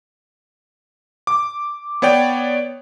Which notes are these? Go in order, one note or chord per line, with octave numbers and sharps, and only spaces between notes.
D6
B3 C#5 D5 G5